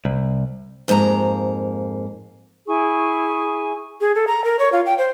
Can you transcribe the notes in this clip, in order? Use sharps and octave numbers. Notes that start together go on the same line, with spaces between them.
C2
F2 G#2 A#3 A5 A#5
E4 G#4 G#5 C#6
G#4
A4
A#5
A#4
C#5
F4
G5
C5